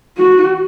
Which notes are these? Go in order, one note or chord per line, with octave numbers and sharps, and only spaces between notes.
F#4